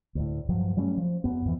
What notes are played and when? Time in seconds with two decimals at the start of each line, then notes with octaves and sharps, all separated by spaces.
0.15 D2 A2
0.49 G2 F3 F#3
0.77 F#3 G3 A3 C#4
0.97 F3
1.24 F#2 B3
1.45 F2 E3